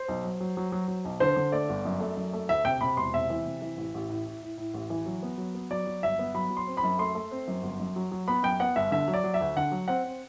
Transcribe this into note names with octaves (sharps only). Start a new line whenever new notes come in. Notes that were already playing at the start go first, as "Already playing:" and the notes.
Already playing: C5
B1
F#3
F#3
F#3
F#3
F#3
B1
D3 C5
D3
A3 D5
G1
F#2
A3
F#2
A3
D2 E5
C3 G5
C3 B5
E1 C6
C3 E5
E3
C3
E3
A1
A1
A2
A2
A2
A2
A1
E3
F#3
B3
F#3
B3
F#3 D5
F#3
G1 E5
B3
F#3 B5
F#3
C6
C4
B5
F#2
A3 C6
A3
C4
F#2
G1
F#2
F#3
F#3
B3 B5
F#2 G5
B3 F#5
G1 E5
D3 E5
F#3
D5
F#3
E5
D2
D3 F#5
F#3
C4 F#5
C4